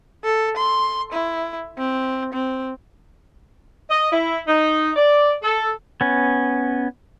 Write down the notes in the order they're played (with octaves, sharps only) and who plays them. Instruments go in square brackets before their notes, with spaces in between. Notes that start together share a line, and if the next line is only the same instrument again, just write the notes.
[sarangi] A4
C6
E4
C4
C4
[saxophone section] D#5
E4
D#4
D5
A4
[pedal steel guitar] B3 C#4